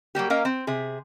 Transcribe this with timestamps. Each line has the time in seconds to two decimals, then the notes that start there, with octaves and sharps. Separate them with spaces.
0.15 F#3 G3 A#3 G4
0.30 A#3 C#4 A#4 D#5 F5
0.45 C4
0.67 C3 G#4